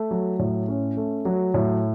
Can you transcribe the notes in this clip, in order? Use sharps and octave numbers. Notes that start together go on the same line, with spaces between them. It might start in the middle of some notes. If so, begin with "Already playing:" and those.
Already playing: A3
F#3
A2
C#4
A3
F#3
A2